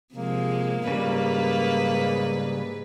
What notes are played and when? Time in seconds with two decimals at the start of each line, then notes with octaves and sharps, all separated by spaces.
0.15 C3 F3 G#3 A#3
0.88 G#2 C#3 G3 B4